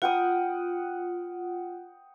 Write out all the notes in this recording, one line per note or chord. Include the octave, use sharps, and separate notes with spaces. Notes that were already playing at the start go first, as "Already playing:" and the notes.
F4 F#5 G5 D#6